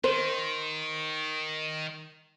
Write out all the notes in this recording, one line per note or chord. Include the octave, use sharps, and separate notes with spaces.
D#3 C5